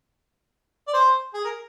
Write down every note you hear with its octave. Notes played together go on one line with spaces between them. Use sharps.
D5
C5
G#4
A#4